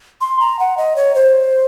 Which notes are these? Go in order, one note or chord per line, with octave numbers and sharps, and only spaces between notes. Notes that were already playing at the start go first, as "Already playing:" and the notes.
C6
A#5
F#5
D#5
C#5
C5